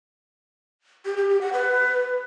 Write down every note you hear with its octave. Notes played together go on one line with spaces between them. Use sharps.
G4
G4
G4
F#5
B4